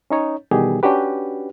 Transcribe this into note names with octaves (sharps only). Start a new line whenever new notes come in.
C#4 D#4 C#5
B2 D#3 E3 G3 G4 G#4
C#4 D4 F#4 G4 B4